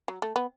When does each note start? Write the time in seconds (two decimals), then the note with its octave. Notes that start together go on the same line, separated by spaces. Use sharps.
0.08 F#3
0.22 A3
0.36 B3